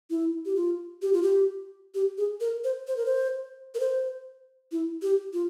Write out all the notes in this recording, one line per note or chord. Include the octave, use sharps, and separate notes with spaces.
E4
G4
F4
G4
F4
G4
G4
G#4
A#4
C5
C5
A#4
C5
A#4
C5
E4
G4
F4